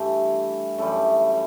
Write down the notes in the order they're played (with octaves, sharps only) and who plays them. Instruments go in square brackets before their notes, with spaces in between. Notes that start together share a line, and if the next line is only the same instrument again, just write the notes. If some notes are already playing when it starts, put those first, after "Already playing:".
Already playing: [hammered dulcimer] G2 E3 G3 A3
F#2 E3 G3 A3